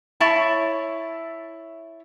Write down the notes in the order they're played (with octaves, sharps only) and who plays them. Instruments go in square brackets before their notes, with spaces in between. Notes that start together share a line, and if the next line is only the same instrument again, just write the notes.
[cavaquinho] E4 C#5 A5